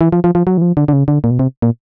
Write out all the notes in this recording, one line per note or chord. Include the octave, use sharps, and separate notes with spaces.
E3
F3
F3
F3
F#3
E3
F3
D3
D3
C#3
D3
A#2
B2
C3
A#2